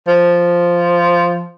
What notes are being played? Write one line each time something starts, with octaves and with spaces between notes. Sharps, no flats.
F3